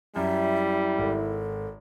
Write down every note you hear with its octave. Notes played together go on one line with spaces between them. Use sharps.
F#2 G3 E4 E5
G#1 A4